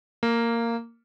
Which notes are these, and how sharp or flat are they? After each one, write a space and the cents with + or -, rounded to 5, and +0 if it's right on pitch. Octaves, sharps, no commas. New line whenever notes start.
A#3 -10